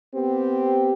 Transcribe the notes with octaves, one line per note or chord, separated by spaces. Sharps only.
B3 C4 G4